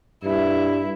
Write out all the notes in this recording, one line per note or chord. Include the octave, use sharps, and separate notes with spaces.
G2 E4